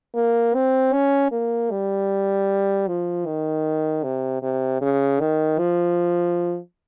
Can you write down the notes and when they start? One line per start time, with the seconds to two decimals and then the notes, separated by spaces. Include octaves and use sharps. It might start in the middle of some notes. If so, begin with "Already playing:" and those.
0.15 A#3
0.55 C4
0.93 C#4
1.32 A#3
1.71 G3
2.87 F3
3.26 D#3
4.04 C3
4.42 C3
4.81 C#3
5.20 D#3
5.59 F3